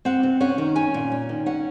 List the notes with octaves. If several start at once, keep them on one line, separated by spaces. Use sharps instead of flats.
C4 F#5
C3
C#4 F#5
D#3
C#4 G#5
A#2
C#4
D#3
C#4 F#5